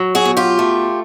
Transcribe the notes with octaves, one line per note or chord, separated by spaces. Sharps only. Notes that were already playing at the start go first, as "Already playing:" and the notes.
Already playing: F#3
F#4 G#4
B2
F4 G4
A3